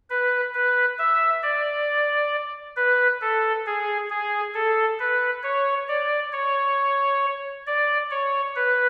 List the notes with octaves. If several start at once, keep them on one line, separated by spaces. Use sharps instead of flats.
B4
B4
E5
D5
B4
A4
G#4
G#4
A4
B4
C#5
D5
C#5
D5
C#5
B4